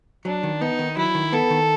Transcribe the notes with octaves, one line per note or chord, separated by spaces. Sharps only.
F#3 D4
D#3
B3 D#4
D#3
F#3 E4
D#3
B3 A4
D#3